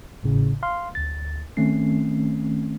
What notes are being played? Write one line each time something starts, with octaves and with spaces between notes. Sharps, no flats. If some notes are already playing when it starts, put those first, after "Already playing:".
G#1 A2 C#3
F5 C6 F6
D2 A6
D#3 A3 C4 C#4 C7